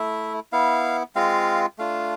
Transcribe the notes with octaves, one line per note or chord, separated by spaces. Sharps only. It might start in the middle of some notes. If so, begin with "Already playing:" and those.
Already playing: A3 E4 E5
B3 E4 F5
G#3 C4 F4 F5
A3 D4 F4 F5